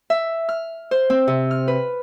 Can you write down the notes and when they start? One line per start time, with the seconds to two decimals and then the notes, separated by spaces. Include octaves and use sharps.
0.10 E5
0.49 F6
0.91 C5
1.10 C4
1.28 C3
1.51 F6
1.68 B4